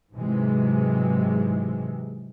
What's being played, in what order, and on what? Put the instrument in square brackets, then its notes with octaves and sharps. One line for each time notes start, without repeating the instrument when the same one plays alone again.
[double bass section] G#2 C3 E3 F#3 G#3